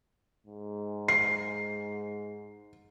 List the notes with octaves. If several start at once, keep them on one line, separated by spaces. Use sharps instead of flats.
G#2
C7